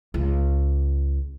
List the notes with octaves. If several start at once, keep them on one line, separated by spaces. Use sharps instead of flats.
C#2